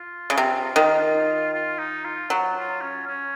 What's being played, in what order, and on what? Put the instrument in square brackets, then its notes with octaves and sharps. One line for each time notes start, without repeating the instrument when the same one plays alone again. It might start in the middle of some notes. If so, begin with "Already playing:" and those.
Already playing: [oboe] F4
[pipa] C#3
C3
D#3
[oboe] F4
D#4
F4
[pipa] F#3
[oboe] F4
C#4
C#4